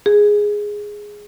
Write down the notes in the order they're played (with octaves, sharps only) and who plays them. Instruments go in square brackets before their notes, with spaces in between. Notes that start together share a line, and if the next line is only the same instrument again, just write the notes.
[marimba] G#4